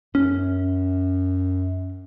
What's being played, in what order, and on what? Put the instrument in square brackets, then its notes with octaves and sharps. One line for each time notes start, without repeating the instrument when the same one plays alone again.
[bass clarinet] F#2 [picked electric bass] C#4